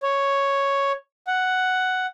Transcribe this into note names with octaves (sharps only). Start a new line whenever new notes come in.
C#5
F#5